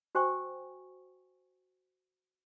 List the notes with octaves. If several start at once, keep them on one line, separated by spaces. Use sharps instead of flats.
F#4 C5 G5 G#5 C#6